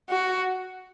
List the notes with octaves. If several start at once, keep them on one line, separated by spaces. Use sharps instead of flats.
F#4